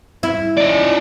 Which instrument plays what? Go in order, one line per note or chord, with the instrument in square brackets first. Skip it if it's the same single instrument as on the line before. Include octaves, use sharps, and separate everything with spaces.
[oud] E4
[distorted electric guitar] D#4 D5